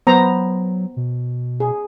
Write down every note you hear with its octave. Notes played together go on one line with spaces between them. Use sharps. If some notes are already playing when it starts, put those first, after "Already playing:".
F#3 B3 C5 A#5
B2
G#4